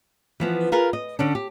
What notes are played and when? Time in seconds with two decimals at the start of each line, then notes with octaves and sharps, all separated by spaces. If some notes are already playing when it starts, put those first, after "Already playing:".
0.40 E3 F3 B3
0.72 F4 G#4 A#4 B4 F5
0.93 D#5
1.19 D3 C#4 D4
1.35 G4